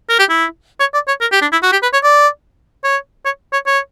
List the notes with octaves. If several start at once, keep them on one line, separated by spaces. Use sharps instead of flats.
A#4
G4
E4
C#5
D5
C#5
A#4
G4
D4
E4
F#4
G4
B4
C#5
D5
C#5
C#5
C#5
C#5